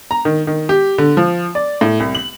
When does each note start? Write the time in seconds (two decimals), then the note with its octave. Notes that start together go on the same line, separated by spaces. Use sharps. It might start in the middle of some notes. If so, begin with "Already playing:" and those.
0.11 A#5
0.25 D#3
0.47 D#3
0.69 G4
0.98 D3
1.17 F3
1.55 D5
1.81 A2
2.00 C2
2.15 F#7